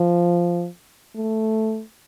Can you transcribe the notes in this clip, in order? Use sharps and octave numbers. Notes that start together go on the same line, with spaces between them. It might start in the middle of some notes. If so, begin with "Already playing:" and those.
Already playing: F3
A3